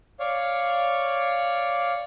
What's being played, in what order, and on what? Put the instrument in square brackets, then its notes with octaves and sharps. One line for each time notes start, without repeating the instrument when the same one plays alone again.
[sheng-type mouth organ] C#5 D5 F5